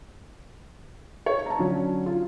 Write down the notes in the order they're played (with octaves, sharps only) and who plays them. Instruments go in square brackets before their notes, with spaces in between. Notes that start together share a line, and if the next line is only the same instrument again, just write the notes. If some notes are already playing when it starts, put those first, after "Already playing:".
[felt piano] C#5
A5 A#5
D3 F#3 C#4
F4